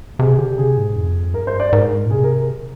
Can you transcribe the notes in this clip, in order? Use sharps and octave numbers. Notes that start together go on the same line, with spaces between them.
C3 G#4
D3 G4
C3 G#4
G#2
F2
G2 A#4
C5
D5
G#2 A#4
A#2
C3 G#4
A#4